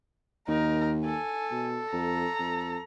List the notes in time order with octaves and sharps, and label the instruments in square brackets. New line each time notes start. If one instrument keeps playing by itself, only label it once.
[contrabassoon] D#2 [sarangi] D#4 [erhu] A#4
[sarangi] A4 [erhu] G#5
[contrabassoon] B2
[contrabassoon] F2 [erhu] A#5
[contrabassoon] F2